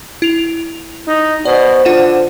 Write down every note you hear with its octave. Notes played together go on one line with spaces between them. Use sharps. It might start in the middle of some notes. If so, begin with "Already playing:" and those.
E4 F7
D#4
B2 C5 D5
D3 F4 F#5 E7